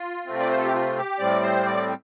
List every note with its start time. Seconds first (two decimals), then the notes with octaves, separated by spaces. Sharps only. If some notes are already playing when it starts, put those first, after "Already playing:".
Already playing: F4
0.26 C3 A3 C4
0.40 D5
0.49 C5
0.57 A4
0.65 G4
0.73 F4
0.97 G4
1.19 A2 G3 C4 D5
1.42 C5
1.66 D5